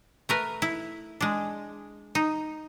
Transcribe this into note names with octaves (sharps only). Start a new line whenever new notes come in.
A3 A#4 B4
E4
G#3 D4
D#4